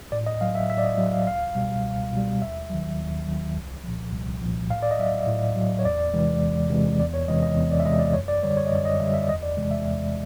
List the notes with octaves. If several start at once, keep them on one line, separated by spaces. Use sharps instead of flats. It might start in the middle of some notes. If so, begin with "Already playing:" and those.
A2 D5
D#5
F#3 F5
E5
A2 E5
D5
D#5
F#3
F5
C#2 F5
B2 G3
C#2
B2 G3
D#2 E5
D#3 F#3
D#2
D#3 F#3
C2
A#2 F3
C2
A#2 F3
A2 F5
D5
D#5
F#3 E5
A2
F#3
C#5
E2 D5
C3 E3 G#3
E2
C3 E3 G#3
E2 D5
C#5
C3 E3 G#3 D#5
D#5
E2
D5
E5
C3 E3 G#3 D#5
D5
F#2 C#5
D5
D3 G3 C#5
C#5
D#5
F#2 D5
D#5
D3 G3 E5
E5
D5
E2 D#5
D5
C3 E3 G#3
E5
E2